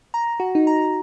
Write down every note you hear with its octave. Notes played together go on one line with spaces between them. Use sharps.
A#5
F#4
D#4
A#5